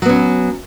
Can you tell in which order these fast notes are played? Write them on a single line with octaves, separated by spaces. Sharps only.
F#3 B3 C#4